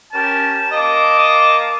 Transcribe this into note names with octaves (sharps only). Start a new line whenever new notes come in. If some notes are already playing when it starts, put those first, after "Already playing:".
C#4 G4 A#4 A5
A#3 D#5 A5 D6
D#5